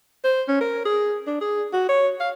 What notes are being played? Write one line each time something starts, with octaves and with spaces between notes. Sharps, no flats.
C5
C#4
A#4
G#4
D4
G#4
F#4
C#5
F5